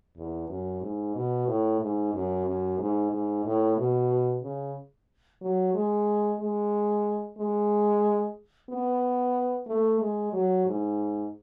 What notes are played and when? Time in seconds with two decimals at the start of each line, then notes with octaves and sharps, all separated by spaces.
0.17 E2
0.49 F#2
0.82 G#2
1.15 B2
1.47 A2
1.81 G#2
2.14 F#2
2.46 F#2
2.78 G#2
3.12 G#2
3.45 A2
3.77 B2
4.43 C#3
5.41 F#3
5.74 G#3
6.40 G#3
7.38 G#3
8.69 B3
9.67 A3
10.00 G#3
10.33 F#3
10.66 G#2